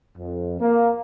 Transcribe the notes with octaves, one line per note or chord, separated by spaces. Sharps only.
F2
A#3